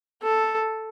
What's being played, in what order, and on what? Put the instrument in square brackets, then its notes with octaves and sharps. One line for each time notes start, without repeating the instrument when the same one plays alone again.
[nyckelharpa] A4